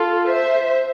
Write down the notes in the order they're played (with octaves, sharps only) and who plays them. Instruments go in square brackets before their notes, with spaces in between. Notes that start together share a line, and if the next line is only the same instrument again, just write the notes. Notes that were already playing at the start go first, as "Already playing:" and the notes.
Already playing: [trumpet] F4 [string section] A4
[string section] C5 E5